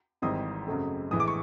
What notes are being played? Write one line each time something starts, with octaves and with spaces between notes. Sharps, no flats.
G#1 G#2 E3 G3 C4 D#6
F#2 C#3 F#3 A3 C4
A#1 A2 E3 G#3 D#6
D6
C#6